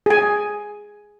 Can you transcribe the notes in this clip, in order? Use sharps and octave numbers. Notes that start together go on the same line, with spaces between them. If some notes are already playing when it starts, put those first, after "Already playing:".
G#4 G#5